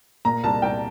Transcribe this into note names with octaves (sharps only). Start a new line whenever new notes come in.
A#2 A#5
C2 A5
C2 G5